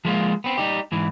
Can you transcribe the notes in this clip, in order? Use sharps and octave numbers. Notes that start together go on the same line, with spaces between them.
F3 G#3 A#3 F4
B3 C4
G3 D#4 G4
G#2 E3